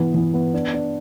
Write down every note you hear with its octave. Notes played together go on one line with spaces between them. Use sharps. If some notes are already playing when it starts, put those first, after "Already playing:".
Already playing: E3 B3
E3
B3
D4
D4